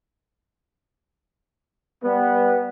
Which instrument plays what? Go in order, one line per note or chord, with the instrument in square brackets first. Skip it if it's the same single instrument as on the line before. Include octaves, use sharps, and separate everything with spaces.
[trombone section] G3 B3